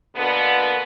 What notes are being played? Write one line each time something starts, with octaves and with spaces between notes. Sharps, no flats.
B2 D3 A#3 B3